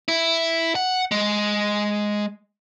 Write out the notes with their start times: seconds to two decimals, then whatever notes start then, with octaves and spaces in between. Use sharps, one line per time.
0.08 E4
0.75 F#5
1.11 G#3